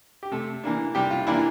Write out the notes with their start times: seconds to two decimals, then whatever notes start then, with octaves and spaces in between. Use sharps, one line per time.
0.23 G4
0.31 C3 A3 A4
0.64 E3 A#3 D4
0.95 C3 G3 G4
1.11 F4
1.27 E3 A#3 D4 E4